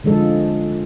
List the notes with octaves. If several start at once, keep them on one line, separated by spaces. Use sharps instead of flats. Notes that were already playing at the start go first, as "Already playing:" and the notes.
D3 F3 G#3 A4